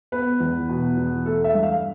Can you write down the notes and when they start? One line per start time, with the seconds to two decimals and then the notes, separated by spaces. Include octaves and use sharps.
0.12 B3 B4
0.40 E2
0.69 B2
0.97 E2
1.25 A3 A4
1.44 E5
1.54 G2
1.62 F5